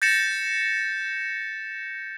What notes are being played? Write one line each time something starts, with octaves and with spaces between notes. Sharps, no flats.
G6 A6 A#6 C#7 E7